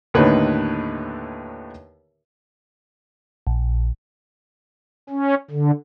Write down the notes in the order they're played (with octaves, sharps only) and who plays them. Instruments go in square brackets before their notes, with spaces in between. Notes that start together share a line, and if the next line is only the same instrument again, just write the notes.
[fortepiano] D#2 A2 D3 D#4 B4 C#5
[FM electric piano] A#1
[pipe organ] C#4
D3